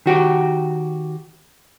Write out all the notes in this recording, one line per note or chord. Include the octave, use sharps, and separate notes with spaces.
D#3 F#4 G4